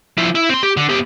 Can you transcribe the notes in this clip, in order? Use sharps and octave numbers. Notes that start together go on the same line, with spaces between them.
F3 E4
E4
C4 C6
G4
D3
B3 G4